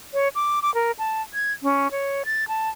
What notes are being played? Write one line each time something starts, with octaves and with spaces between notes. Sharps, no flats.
C#5
D6
D6
A#4
A5
G#6
C#4
C#5
A6
A5